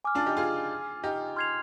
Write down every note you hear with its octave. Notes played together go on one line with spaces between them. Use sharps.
G#5 D6 F6
D4 F4
D#4 G4
F4 G#4
D#4 G4
C6 F6 G#6 C7 F7